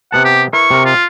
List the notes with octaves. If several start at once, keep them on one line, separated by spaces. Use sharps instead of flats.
C3 B3 F#5 A5
G4
E4 A#4 B4 C#6
C3 A#4
F4